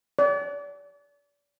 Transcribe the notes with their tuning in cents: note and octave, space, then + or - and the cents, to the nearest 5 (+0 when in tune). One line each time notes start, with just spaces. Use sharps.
D5 -35